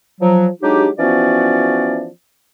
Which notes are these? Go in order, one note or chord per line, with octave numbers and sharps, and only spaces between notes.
F3 F#3
F#3 G#3 D4 D#4 G4
E3 F3 B3 C#4 F#4 D5